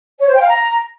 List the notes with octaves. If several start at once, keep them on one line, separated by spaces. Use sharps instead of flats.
C#5
C5
G5
F5
A#5